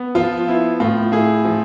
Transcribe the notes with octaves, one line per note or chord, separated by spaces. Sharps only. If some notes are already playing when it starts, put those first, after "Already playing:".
Already playing: B3
F3 F4
B3 E4
A2 F4
A2 E4 G#4
F3